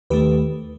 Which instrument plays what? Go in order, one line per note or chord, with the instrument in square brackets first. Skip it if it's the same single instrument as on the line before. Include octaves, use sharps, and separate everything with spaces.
[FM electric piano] D#2 D#3 A3 G4 B4